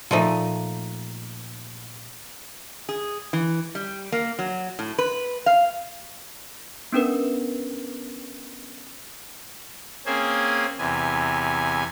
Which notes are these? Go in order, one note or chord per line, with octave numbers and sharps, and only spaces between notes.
A#2 F3 A3 D#4
G#4
E3
G3
A#3
F#3
A2
B4
F5
B3 C#4 D4 A#4 B4
A#3 C4 C#4 G#4 C5 G#5
E2 C3 G#5